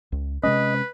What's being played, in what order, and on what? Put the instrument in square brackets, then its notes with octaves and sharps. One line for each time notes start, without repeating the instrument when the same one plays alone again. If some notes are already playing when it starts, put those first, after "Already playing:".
[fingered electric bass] C#2
[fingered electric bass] C3 G#3 C#4 [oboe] B4 [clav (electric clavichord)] D#5